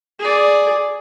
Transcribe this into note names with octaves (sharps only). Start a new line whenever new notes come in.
G#4 D5